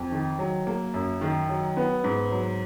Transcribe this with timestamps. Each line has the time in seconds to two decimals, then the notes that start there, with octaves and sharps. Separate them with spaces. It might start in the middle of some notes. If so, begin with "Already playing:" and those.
Already playing: F2
0.12 D#3
0.39 F#3
0.67 A#3
0.94 F#2
1.21 D#3
1.49 F#3
1.77 B3
2.04 G#2
2.31 F#3